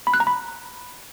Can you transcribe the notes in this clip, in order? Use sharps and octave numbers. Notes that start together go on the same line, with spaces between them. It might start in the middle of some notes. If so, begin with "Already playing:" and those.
B5
F#6
A#5
B5